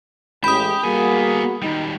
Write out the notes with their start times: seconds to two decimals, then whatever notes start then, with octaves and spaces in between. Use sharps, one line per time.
0.44 A1 G#3 G4 G5 B5 D#6
0.84 G3 A#3 B3 F#4 G#4 G#5
1.62 D#3 G3 D#4